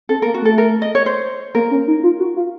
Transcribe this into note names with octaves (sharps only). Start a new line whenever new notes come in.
C4 A4
A#3 A#4
F#4
A3 A4
A#4
D#5
C#5
C5
A#3 A#4
C#4
D#4
F4
F#4
F4